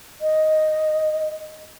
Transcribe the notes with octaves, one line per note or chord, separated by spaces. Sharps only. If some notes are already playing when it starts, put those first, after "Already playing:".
D#5